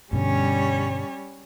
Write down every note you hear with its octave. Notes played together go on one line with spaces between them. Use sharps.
G2 B2 D3 G3 C#4 C#5